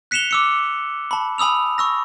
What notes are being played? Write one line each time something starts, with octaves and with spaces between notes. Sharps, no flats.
F#6 B6 C#7 E7 F7 G7
D6 E6 C#7
A5 B5
G#5 B5 D#6 E6 F7
C#6 E6 A#6